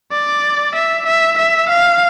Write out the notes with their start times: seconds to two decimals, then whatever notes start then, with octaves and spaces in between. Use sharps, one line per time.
0.12 D5
0.75 E5
1.07 E5
1.38 E5
1.69 F5